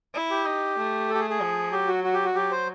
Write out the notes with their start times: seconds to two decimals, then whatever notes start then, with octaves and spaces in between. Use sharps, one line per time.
0.14 E4
0.31 G4
0.46 D#4
0.78 A3
1.09 A4
1.15 G4
1.20 G#4
1.30 G#4
1.40 F3
1.72 F#3 G4
1.87 F#4
2.04 F#4
2.14 G4
2.25 F#4
2.35 F#3 G4
2.51 C5